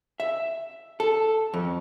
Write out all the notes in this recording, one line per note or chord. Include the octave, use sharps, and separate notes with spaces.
E5
A4
F2